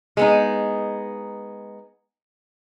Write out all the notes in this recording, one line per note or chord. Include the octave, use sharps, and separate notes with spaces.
G#3 B3 D#4